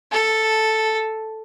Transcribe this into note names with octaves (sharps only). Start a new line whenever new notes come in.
A4